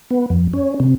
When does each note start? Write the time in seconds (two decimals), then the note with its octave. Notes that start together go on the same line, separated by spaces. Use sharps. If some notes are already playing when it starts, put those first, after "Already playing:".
0.10 B3
0.30 F2
0.53 C#4
0.80 C3